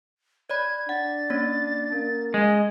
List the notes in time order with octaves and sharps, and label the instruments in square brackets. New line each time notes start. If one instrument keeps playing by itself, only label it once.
[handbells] C#5 D5 B5 [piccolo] G#6
[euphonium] D4 [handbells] F#5 [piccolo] A6
[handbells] A#3 C#4 C#5
[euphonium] A#3 [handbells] C#4
[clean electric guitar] G#3 [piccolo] D#5